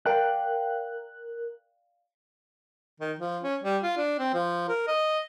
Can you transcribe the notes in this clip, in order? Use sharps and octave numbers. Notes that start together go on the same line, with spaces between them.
A#4 D5 F5 G5 F#6
D#3
F3
C#4
G3
F4
D4
C4
F3
A#4
D#5